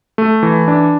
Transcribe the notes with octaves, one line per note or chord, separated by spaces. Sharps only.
A3
E3
D4